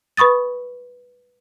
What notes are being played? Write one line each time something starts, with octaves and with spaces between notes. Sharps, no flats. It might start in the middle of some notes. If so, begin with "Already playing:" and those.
B4 B5 C#6 D#6 A6